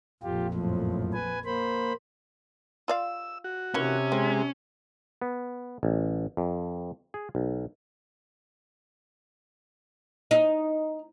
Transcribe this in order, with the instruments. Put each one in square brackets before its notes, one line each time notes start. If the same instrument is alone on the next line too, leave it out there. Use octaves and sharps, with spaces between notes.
[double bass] A#1 F2 [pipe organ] F4 G4
[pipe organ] F#2 A2 F3
B4 G#5
A#3 C5 B5
[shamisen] F4 D5 F5 [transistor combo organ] E6
[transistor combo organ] F#4
[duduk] C3 [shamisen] D#3 E3 A#3 [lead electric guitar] C#4
[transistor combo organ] G#3 [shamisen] C4
[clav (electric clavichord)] B3
A1
F2
G#4
B1
[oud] D#4